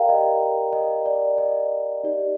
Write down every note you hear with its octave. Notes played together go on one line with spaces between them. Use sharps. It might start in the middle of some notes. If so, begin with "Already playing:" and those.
Already playing: G4 A#4 D5 F5 G5 A#5
D#5
D#5
D5
D#5
D#4 G4 D5